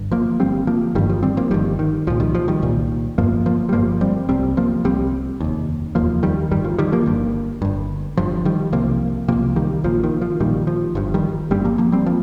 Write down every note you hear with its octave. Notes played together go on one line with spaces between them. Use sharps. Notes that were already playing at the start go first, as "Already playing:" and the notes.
Already playing: G1 G2
F3 A#3
G1 G2 G3 C4
F3 A#3
G1 G2 D#3 G3
F3
G3 C4
F3 A#3
G1 G2 D#3 G3
D#3
C2 A#2 F3
D#3 G3
F3
D#3 G3
C2 A#2
G1 G2 F3 A#3
F3 A#3
G3
G1 G2 F3 A#3
G3 C4
C2 C3 G3 C4
F3 A#3
C2 C3 G3 C4
F1 D#2
F1 D#2 F3 A#3
D#3 G3
G1 G2 D#3 G3
F3
D#3 G3
F3 A#3
G1 G2
G1 G2
G1 G2 F3
D#3 G3
C2 C3 F3 A#3
C2 C3 F3 A#3
D#3 G3
A#1 A#2 F3
D#3
F3
A#1 A#2 D#3 G3
F3
G1 G2 F3
D#3 G3
G1 G2 G3 C4
F3 A#3
F3 A#3
G3 C4
F3 A#3